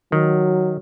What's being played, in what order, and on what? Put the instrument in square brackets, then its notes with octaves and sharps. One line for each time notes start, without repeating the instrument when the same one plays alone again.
[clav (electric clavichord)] D#3 [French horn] F#3